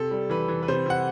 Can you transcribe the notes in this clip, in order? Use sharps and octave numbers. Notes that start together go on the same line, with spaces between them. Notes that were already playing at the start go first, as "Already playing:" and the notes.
Already playing: C3 A4
G3
E3 B4
E3
B4
C3 C5
C3 F#5